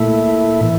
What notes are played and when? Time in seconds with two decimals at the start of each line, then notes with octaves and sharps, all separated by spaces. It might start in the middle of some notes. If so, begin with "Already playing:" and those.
Already playing: A#2 A3 E4
0.61 A2 E3